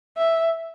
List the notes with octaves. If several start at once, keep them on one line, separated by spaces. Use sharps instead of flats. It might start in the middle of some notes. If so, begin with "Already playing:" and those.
E5